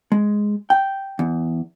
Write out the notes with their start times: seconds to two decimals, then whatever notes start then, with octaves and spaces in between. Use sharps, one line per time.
0.12 G#3
0.70 G5
1.19 E2